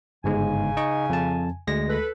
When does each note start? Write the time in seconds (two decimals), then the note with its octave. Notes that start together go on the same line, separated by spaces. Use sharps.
0.24 G1 G#2 C#3 G#3 G#5
0.77 D#4 D#5 C#6
1.10 F2 A5
1.68 D2 G#3 A#6
1.88 A4 B4